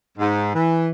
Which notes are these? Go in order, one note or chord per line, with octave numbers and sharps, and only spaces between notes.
G#2
E3